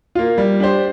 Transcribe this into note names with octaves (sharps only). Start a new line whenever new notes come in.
A#3 F4
G3
D4 G4 C5